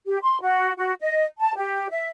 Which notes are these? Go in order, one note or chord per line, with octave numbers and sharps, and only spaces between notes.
G4
C6
F#4
F#4
D#5
A5
G4
E5